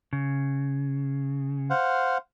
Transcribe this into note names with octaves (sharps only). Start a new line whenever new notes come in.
C#3
C5 F5 F#5